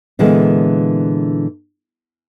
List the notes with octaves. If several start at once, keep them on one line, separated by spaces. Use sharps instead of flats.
A#2 D3 E3 G#3 A#3 B3